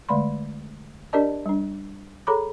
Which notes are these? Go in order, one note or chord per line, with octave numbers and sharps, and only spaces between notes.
D3 G#3 A3 D5 B5 C6
D4 G4 A#4 D5 D#5 A5
G3 D4
G#4 A4 C#5 A#5 B5 D6